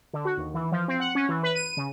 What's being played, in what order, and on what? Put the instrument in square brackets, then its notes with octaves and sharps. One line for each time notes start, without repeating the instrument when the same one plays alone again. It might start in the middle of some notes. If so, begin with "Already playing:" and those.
[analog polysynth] D3
F#4
D#2
E3
F3
C4
F#5
C#4
E3
B4
D#7
C#3